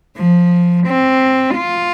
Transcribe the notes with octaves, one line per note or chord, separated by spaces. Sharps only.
F3
C4
F4